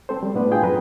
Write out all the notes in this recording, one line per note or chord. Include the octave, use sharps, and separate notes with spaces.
G#3 C4 A4 C5
G3
A2 A3 B3 D4 B4
F4 G#4 G5
F#2 B4 A#5